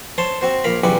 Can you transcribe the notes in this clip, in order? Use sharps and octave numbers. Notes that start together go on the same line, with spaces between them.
C5 C#5 A5 C6
C4 F#4 C5
A#1 A#4 F5 B5
B1 E2 C#3 G3 G4 F#5